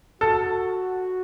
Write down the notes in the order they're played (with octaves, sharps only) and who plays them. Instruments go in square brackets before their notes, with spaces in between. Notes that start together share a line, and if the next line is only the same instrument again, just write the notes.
[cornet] F#4 [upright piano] A4